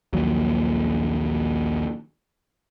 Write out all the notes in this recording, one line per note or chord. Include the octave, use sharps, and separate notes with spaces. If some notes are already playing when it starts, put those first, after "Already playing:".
A#1 D#2 A#2 F#3